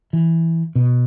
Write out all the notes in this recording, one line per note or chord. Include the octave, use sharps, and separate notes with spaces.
E3
B2